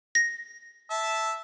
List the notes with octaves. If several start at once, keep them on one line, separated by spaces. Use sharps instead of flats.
A#6
E5 A5